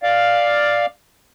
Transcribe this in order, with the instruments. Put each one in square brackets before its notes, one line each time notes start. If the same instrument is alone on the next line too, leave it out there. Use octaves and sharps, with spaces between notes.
[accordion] D5 F5